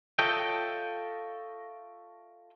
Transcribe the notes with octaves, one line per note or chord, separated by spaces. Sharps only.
F4 A4 C#5 D#5 E5 G5